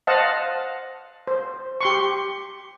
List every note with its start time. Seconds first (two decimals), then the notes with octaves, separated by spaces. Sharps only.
0.07 C5 D#5 F5 F#5 A5
1.27 C5
1.81 G4 C6 C#6